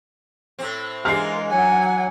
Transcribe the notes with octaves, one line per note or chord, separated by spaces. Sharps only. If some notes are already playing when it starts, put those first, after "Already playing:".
A2 C4
E3 G#3 D4 F4 A#4 F6 C7
F#3 F#5 G#5